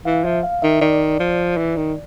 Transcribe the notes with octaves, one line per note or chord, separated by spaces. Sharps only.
E3 F5
F3 E5
F5
D#3 E5
D#3 D5
F3
E3
D#3